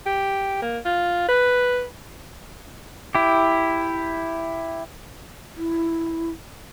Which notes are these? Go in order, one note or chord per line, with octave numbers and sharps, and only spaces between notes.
G4
A#3
F4
B4
E4 G4
E4